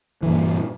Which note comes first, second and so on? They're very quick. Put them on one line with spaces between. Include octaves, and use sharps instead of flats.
E3 A#2 G2